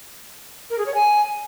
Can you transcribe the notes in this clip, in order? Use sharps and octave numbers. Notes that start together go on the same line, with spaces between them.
A#4
G#4
C#5
G#5